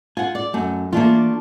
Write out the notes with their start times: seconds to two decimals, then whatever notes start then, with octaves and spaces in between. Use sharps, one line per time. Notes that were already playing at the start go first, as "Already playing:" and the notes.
0.17 F4 F#5 G#5
0.35 D5
0.54 F#2 A3
0.93 E3 A3 A#3 D4 F4